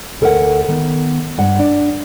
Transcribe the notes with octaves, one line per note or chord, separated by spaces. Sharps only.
D2 A4 A#4 D5 E5 F#5
D#3 B3
G2 F#5
D4